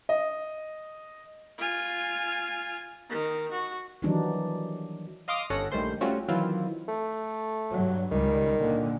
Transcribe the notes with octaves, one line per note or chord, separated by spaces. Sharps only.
D#5
F4 G#5
D#3
F#4
D#3 E3 F#3 G3 D4 D#4
D#5 F5 C6 D6 D#6 F6
G1 C#4 A4 F#5 A#6
A#1 D#3 G3 A3 C5 C6
G3 A3 C4 C#4 F4 F#4
D#3 E3 F#3 C4 E4 F4
A3
G2 F#3
C#2 D#3 G3
A#2 D3